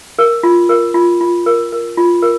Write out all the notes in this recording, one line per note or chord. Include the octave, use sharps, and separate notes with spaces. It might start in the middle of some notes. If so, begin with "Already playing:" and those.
A#4
F4
A#4
F4
F4
A#4
A#4
F4
A#4